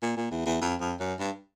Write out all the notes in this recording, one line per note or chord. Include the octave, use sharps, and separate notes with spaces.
A#2
A#2
E2
E2
F2
F2
F#2
G2